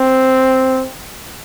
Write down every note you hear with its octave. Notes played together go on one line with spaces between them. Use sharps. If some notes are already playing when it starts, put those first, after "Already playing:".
Already playing: C4